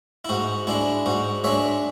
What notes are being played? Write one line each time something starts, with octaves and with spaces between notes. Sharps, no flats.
E4
G#2 F#4
G#3 D4 E4
G#2 F#4
G#3 D4 C#5 E5